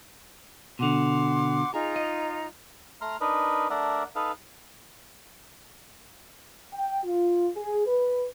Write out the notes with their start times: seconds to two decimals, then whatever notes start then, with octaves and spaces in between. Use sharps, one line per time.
0.79 B2 D3 F#5 C6 D6
1.74 D#4 F4 G#4 A#5
1.96 D#5
3.01 A3 A#5 C6 F6
3.21 D4 D#4 A#4 B4
3.70 A3 D4 A#4 D5 E5 F#5
4.16 D#4 A4 B4 F5
6.73 G5
7.04 F4
7.56 G#4
7.86 B4